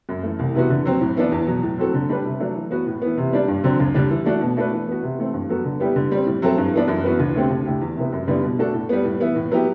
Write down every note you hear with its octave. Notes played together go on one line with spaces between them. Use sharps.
F#2
E3 A3
C2
C3 E3 B3 F#4
D3
F#3 C4
A2
E3 B3 D4
E2
B2 F#3
A2
F#3 C4 F#4 A4
D3
G3 D4 G4 B4
C3
F#3 A3 D4
E3
B3 F#4 B4
A2
E3 B3
C3
G3 D4
G2
D3 F#3 C4
D2
D3 G3 D4
E3
A3 D4 F#4
B2
A3 D4 F#4 B4
E3
B3 F#4
C3
E3 A3 C4
G2
F#3 B3 F#4 A4
D3
G3 B3 E4 G4
D3
G3 C4
A2
F#3 C4 E4 A4
G2
E3 B3 D4
F#2
E3 B3 F#4 B4
D2
D3 A3 C4 G4
D2
D3 A3 E4 G4
E2
C3 E3 B3 E4
F#2
D3 G3 B3 E4
B2
A3 D4 F#4 A4
A2
G3 B3
A2
E3 B3 E4
A2
F#3 B3 E4 G4